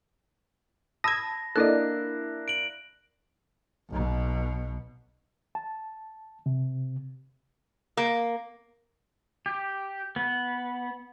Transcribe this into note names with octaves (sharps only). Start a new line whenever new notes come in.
A5 B5 D#6 E6 G#6 A#6
A#3 D4 E4 A4 D5 D#5 F#6
D7 F#7
B1 B2
A5
C3
A#3
G4
B3